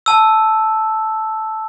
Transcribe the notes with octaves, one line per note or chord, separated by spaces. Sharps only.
A5 E6